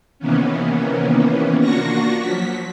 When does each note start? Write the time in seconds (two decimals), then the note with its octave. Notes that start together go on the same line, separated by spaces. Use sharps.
0.19 C3 D#3 E3 A#3 B3 C#4
1.60 A#3 D4 F4 F#4 C#6 A#6
2.19 F3 F#3 B6